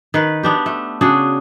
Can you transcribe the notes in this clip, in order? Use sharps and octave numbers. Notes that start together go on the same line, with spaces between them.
D#3 B4
B3 D4 G4
A3
C#3 D4 F#4 G#4